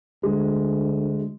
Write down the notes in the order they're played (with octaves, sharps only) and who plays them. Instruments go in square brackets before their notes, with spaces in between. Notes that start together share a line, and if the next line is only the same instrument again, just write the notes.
[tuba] D2 [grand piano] G#3